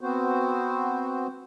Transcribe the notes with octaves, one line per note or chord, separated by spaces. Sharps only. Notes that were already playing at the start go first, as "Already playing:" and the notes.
B3 C4 F#4 C5